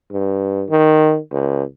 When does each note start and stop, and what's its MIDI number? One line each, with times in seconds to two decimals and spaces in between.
0.12 0.64 43
0.70 1.18 51
1.32 1.63 37